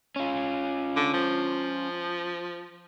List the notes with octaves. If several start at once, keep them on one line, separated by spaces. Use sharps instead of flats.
C#4 F4
D3
F3